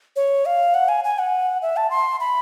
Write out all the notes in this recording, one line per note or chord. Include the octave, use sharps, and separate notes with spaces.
C#5
F5
F#5
G#5
G#5
F#5
E5
A5
C6
B5